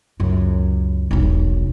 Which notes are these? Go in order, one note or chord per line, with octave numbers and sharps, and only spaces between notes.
C#2 F#2
E1 B1